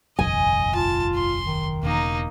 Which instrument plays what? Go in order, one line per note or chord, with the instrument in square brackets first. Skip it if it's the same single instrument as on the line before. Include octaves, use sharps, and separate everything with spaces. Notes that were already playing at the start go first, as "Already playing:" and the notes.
[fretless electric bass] F#1 B1 E2 [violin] D#5 [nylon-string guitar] G#5
[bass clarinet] F4 [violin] A5
[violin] C6
[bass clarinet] D#3
[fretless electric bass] E1 C#3 [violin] A#3 D#4